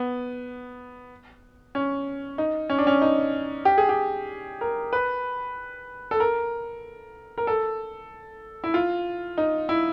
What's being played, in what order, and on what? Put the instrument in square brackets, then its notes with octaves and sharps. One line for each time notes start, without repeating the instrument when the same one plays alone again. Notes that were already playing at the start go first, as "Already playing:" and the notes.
Already playing: [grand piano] B3
C#4
D#4
C#4
D4
C#4
D#4
G4
G#4
G4
A#4
B4
A4
A#4
A#4
A4
E4
F4
D#4
E4